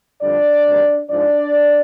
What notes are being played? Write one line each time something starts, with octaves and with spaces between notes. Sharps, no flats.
F2 D3 G3 D4 D5
D2 C3 D#3 G3
G#2 F3 D4 D5